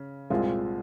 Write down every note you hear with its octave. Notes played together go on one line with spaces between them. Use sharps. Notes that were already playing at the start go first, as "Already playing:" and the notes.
Already playing: C#3
C2 A#2 G#3 C4 F4